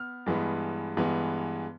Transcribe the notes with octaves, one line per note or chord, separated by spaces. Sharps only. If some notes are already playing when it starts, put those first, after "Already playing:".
Already playing: B3 F6
G2 E3 G#3 B3
G2 E3 G#3 B3